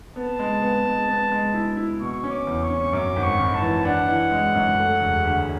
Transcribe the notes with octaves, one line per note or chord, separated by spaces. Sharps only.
B3 A5
G#3
B3
G#3
B3
G#3
E4
E4
B2 C#6
C#4
D6
E2
C#6
C#4
F#2 D6
G#1
C#6
G#1
A5
E3
D4 F#5
E3
G#3
F#2
A3
E1
D2